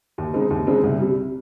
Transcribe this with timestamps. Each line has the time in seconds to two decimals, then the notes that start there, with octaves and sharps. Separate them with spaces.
0.18 D#2
0.34 C#3 G#3 C4 D#4
0.50 D#2
0.67 C#3 G#3 C4 D#4
0.84 C2
1.01 C3 G3